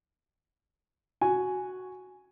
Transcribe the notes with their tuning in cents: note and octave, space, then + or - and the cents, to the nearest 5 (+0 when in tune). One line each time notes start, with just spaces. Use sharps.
F#4 +0 G#5 +5